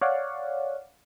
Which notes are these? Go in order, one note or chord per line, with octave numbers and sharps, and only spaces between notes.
C#5 D5 F5 F#5